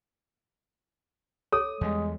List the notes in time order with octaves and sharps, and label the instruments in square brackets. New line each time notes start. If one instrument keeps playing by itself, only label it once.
[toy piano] A4 C#5 [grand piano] D#6
[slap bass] E2 G3 [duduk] G#3